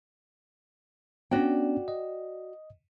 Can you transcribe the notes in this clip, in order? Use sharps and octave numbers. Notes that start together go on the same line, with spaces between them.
B3 C#4 D4 F#4 D5 G5
D#5